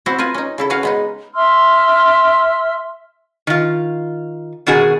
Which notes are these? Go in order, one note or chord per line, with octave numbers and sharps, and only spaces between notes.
C4 E4 F#4 C5
F4 A#4 B4 G#5
C#4 D#4
C#3 E4 A4
C#4 F#4 B4 F5 F#5
G#3 B3 D#4
E5 C6 E6 F6
D#3 F4
B2 D#3 F#4 G#4